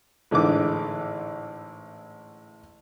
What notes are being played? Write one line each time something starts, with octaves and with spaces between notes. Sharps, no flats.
A1 G#2 D3 E3 D6